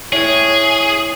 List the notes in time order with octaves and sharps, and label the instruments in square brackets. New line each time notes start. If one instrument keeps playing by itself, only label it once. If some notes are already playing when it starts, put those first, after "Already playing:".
[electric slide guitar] E4 C#5 [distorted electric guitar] G#4